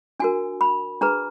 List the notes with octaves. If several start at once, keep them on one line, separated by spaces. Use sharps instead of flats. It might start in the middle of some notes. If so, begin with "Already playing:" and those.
D4 F#4 A#4 G#5
B5
D4 G#4 B4 A#5